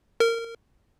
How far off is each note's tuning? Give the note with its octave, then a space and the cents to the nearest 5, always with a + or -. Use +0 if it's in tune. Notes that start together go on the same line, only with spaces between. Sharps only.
A#4 -20